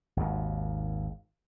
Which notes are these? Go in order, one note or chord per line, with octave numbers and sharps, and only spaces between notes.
G#1 D#2